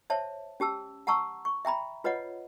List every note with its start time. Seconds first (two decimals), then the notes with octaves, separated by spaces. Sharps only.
0.10 C5 C#5 E5 A5
0.60 C#4 G4 A5 E6
1.07 F#5 A5 A#5 C#6 E6
1.45 C#6
1.65 E5 G5 A#5 B5
2.04 F4 B4 C#5 D#5 F#5